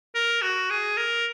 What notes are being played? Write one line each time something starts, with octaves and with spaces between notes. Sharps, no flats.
A#4
F#4
G#4
A#4